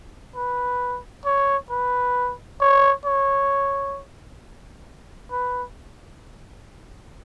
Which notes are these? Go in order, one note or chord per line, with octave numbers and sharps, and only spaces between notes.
B4
C#5
B4
C#5
C#5
B4